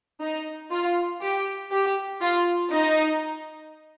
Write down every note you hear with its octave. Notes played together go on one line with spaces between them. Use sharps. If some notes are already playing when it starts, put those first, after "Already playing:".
D#4
F4
G4
G4
F4
D#4